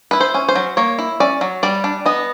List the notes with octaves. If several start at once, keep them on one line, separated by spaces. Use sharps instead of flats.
E4 B4
C5
C#4
C5
F#3
A#3 C#5
E4
C#4 D5
F#3
G3 D5
D4
B3 D#5